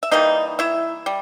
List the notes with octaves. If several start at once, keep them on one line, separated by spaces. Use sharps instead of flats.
E5
E3 G3 A#3 D#4 D#5
E4 E5
G3